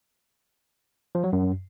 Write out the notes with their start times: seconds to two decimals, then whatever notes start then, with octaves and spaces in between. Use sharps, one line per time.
1.15 F3
1.24 F#3
1.33 F#2